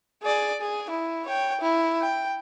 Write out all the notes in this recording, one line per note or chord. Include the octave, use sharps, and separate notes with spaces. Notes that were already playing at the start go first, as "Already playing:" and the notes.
G#4 D5
G#4
E4
C#5 G5
E4
G5